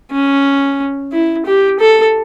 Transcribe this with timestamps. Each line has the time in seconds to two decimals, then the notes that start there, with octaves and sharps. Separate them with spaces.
0.12 C#4
1.12 E4
1.46 G4
1.79 A4